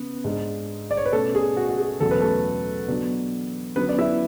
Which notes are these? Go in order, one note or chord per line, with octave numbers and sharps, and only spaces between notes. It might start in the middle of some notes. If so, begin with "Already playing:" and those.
Already playing: C#3 B3 C#4
G#2 G#3 D4
D5
C#5
B4
B2 A3 C#4 A4
G#4
F#4
F#4
G#4
E2 B2 F#3 A3 C#4 A4
B4
A3 A4
B2 F#3 B3 D4
D3 F#3 B3 C#4 B4
D5
E4 E5